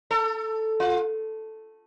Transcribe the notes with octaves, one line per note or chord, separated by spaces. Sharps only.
A4
F4